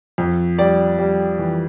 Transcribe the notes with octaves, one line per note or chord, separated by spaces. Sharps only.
F2
G3 D5
G3
E3